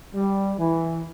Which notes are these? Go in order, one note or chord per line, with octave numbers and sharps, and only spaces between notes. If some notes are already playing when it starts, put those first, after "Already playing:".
G3
E3